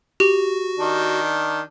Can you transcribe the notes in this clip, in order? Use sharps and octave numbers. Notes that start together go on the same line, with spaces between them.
F#4 G4
D#3 D4